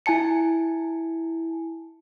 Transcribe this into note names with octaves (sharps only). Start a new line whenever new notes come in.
E4 G#5 A5 C#7